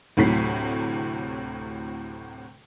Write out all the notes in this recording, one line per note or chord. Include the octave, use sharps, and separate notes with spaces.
D2 A2 C3 F#3 B6 C7